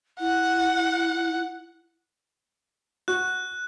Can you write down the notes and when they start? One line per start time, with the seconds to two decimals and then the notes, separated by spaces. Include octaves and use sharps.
0.20 E4 F#5
3.08 F#4 F#6